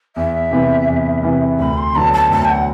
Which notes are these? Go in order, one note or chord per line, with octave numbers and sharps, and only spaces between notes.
E2 E5
C3 E3 B3
E2
C3 E3 B3
D2 B5
C6
D3 F#3 B3 A5
A5
D2 A5
G5
F#5